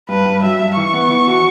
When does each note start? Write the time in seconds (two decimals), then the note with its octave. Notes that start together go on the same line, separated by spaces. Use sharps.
0.09 G2 B4
0.26 G2
0.42 F#3 E5
0.59 G2
0.76 E3 C#6
0.94 B3
1.10 E3
1.28 F#4